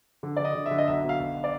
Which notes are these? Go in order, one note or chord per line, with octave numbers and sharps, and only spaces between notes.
D3
D5
D3
D#5
D3
E5
D3
D#5
B1 E5
B2
F5
B1
D5